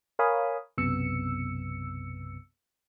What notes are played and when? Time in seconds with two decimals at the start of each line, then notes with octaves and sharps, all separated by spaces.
0.19 A#4 C#5 F5 G#5 B5 D#6
0.78 B1 F#2 C3 B3 E6 C#7